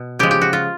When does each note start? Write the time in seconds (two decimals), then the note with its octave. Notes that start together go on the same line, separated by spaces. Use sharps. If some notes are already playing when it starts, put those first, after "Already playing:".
Already playing: B2
0.19 C#3 F3 G#3 G4
0.31 G4
0.42 F#4
0.53 F4